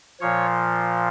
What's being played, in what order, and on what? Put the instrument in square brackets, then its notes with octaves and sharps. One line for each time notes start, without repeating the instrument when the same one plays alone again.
[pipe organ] A#2 F3 C#5